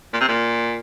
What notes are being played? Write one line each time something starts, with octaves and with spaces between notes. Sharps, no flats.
A#2
C3
A#2